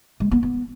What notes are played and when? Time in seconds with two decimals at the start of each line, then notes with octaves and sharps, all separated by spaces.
0.20 G#3
0.31 B3
0.43 B3